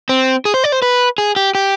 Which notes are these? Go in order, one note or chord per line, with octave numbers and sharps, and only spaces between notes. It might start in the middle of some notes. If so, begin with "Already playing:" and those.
C4
G#4
C5
D5
C5
B4
G#4
G4
G4